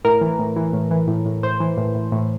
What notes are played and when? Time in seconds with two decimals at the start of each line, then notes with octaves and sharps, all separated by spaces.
0.05 A2 A#4
0.21 E3
0.39 A2
0.56 E3
0.73 A2
0.91 E3
1.08 A2
1.26 A2
1.43 A2 C5
1.60 E3
1.78 A2
1.95 A2
2.12 A2